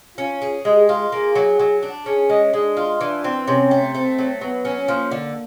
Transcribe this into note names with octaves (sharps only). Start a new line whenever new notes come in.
C#4 F4
G#4
G#3 G4
F4
A#3 G#4
F#3
F#3
D4
C#4 G#4
G#3
G#3 D4
F4
E3 D4
C4
C3 C#4
A3
A3 C4
F#3
F#3 B3
C#4
F3 A#3
D3